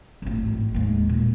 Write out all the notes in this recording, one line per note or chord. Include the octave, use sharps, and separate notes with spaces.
G#1 A2
D#2 G#3
A#2